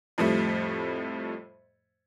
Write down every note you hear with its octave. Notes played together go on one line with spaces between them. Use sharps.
F2 A2 F3 G3 A3